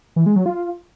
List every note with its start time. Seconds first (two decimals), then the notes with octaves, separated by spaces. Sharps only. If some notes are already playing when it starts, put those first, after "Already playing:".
0.16 E3
0.26 G#3
0.36 F#3
0.46 F4